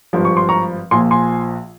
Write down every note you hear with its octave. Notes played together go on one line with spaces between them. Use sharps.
G#1 G2 F3
C#6
C6
A#5 C#6
A#1 A#2 F3 G#5 C6
G#5 C6